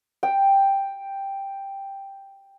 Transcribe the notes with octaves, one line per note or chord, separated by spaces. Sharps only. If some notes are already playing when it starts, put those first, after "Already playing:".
G5